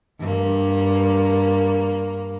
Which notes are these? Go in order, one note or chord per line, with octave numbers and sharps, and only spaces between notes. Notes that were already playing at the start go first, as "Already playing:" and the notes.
G2 A#3